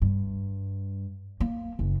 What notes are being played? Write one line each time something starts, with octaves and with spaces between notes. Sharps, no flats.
G2
A#3
F#1